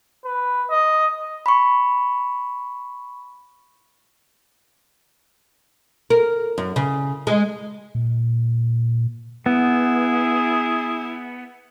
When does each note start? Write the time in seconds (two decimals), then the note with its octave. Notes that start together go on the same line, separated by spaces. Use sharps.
0.25 B4
0.70 D#5
1.46 B5 C#6
6.10 A#4
6.58 F#2
6.76 C#3
7.27 G#3
7.95 A#2
9.46 B3 E4 G#4